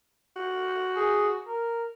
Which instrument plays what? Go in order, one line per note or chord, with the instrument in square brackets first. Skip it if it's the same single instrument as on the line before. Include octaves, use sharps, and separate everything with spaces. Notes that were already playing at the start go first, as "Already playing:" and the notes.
[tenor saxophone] F#4
[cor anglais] G#4
A#4